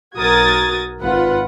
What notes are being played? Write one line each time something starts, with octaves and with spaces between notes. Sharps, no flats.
B1 F#4 A#4 D#6 G#6 A6
G#1 F4 B4 F#5